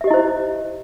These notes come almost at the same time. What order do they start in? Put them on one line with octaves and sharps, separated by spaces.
E5 G4 D#5 E4 C5